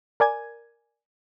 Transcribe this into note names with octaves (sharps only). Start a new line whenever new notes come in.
A#4 D5 G#5 G#6